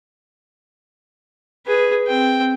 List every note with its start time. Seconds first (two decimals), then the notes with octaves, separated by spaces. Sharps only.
1.66 G#4 B4
2.07 C4 G5